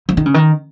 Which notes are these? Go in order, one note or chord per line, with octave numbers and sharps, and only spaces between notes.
F3
D#3
C#3
D#3